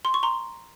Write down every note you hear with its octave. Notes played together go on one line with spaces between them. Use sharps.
C6
C#6
A#5 C6